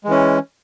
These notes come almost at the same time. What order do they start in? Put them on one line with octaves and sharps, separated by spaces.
G#3 E3 C#4